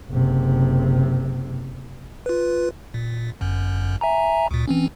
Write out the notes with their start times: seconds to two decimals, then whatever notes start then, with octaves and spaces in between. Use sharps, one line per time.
0.10 F#1 C3
2.26 F4 B4
2.94 A#2
3.41 G1 F#2
4.01 E5 G#5 A#5
4.51 D2 A#2
4.68 E3 C4 C#4